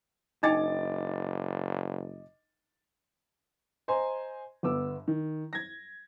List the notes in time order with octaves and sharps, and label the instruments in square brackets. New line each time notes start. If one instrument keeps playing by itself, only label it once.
[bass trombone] F#1 [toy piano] D4 D#4 G5 [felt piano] D#5 D6 A6
[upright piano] C5 D#5 G#5 A#5 C6
G1 B3 D6 E6
D#3
G#6 A#6